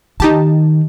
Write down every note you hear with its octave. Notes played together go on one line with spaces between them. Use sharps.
D#3 D#4 G4 A5